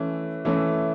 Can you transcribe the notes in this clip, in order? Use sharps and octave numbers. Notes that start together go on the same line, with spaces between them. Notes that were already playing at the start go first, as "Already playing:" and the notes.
Already playing: E3 A3 C#4
E3 A3 C#4